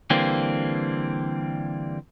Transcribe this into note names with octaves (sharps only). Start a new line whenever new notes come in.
D3 E3 G3 A#3 C4